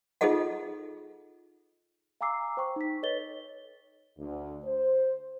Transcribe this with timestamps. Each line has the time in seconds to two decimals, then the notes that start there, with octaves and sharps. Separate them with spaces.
0.21 D#4 F4 G#4 A4 D#5 F#5
2.21 F5 G#5 A#5 D6 E6 C7
2.57 C5 G5 C#6
2.76 D#4 B6
3.03 A4 B4 C#5 D#5 A6 G7
4.18 D2
4.64 C5